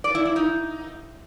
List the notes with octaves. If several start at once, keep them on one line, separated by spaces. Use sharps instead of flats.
D5
E4
E4
D#4